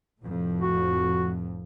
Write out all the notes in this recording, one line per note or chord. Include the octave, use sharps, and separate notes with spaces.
F1 F2 A2
F#4